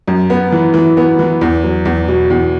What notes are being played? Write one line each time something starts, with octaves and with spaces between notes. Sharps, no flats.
F#2
B3
E3
E3
B3
E3
E2
F#3
E2
B2
E2